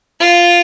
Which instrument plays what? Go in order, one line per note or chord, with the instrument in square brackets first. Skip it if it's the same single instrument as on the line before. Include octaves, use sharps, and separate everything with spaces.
[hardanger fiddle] F4